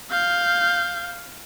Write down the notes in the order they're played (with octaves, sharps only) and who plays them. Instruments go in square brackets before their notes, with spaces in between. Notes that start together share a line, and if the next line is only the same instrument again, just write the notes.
[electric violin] F5 G6